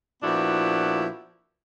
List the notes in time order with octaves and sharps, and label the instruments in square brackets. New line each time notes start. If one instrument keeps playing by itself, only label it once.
[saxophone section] A#2 F3 B3 D4 E4 F#4